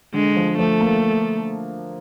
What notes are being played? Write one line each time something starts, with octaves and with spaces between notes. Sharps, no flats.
D3 G#3
F3
F3 A3
A#3